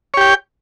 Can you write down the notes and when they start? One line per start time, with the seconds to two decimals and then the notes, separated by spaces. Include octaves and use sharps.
0.14 C#5
0.17 G4
0.21 G5